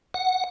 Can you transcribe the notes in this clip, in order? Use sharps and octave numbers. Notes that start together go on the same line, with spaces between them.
F#5